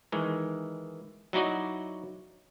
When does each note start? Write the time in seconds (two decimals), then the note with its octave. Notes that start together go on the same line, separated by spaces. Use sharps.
0.12 D#3 E3 G#3
1.33 F#3 D#4 E4 F#4 D5 D#5